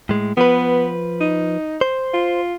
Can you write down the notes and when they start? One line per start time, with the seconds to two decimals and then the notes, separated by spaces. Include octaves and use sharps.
0.09 A2 G#3
0.37 F3 B3 B4
1.21 D#4
1.81 C5
2.14 F4